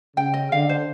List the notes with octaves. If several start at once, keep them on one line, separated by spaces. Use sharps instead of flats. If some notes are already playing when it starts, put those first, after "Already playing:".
C#3 G5
D#5
D3 F5
C5